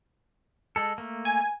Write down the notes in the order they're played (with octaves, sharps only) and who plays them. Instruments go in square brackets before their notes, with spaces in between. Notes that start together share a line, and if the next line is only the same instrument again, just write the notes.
[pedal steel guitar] G#3 A4
A3 A#3
[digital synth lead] G#5